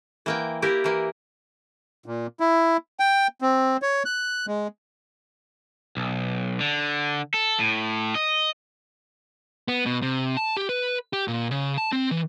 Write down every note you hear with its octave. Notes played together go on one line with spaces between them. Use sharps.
E3 A#3 G5
A#3 E4 G4 A#4
E3 A#3
A#2
E4
G5
C4
C#5
F#6
G#3
B1
D3
A4
A2
D#5
B3
B2
C3
A5
G4
B4
G4
A#2
C#3
A5
C4
E3